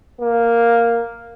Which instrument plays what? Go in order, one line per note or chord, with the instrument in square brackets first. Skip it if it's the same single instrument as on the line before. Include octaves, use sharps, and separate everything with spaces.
[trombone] A#3